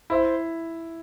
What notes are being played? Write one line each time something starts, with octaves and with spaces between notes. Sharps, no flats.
E4 C5